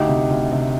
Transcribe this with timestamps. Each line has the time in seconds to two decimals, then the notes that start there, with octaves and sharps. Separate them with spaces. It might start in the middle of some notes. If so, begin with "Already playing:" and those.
Already playing: D2 D#4 G4
0.08 C3
0.30 D2
0.52 C3